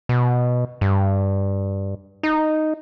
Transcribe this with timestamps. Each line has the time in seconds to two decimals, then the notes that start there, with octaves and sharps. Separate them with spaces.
0.09 B2
0.81 G2
2.23 D#4